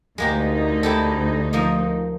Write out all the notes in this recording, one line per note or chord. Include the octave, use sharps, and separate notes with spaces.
D2 G#3 A#3 D#4 G4
E4 G4 A4
F3 A#3 D#5